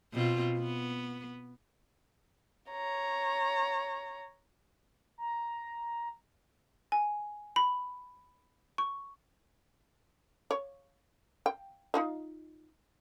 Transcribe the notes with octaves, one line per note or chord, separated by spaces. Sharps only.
B2 C4 F4
B3
C#5 A#5
A#5
G#5
B5
C#6
C#5
G5
D#4 F4 D#5